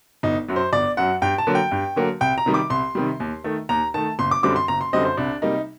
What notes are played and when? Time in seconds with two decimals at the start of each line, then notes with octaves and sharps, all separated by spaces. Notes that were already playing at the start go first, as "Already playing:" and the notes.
0.23 G1 D#4
0.48 F#2 F#3
0.56 C5
0.72 G1 D5
0.97 F#2 F#3 F#5
1.22 G2 G5
1.38 A5
1.47 D3 F#3 A#3
1.55 G5
1.71 G2
1.96 D3 F#3 A#3
2.21 C2 G5
2.38 A#5
2.46 C3 D#3 G3
2.54 D6
2.70 C2 C6
2.95 C3 D#3 G3
3.20 D#2
3.44 D#3 A3
3.69 D#2 A#5
3.94 D#3 A3 A5
4.19 F#1 C6
4.31 D6
4.43 F#2 D3 G3 C4 D6
4.56 C6
4.68 F#1 A#5
4.81 C6
4.93 F#2 D3 G3 C4 D#5
5.05 C5
5.17 C2 D4
5.42 C3 G3 A#3 D#4